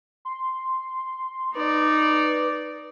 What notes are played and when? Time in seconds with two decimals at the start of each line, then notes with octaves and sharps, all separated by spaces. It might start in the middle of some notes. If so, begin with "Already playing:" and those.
0.25 C6
1.55 D#4 B4 D5